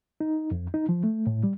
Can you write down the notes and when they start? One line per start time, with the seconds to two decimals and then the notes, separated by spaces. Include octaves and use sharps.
0.20 D#4
0.51 F2
0.74 D#4
0.89 F3
1.04 A3
1.27 A2
1.43 G3